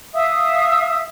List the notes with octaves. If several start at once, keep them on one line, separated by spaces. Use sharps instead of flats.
E5 F5 D#6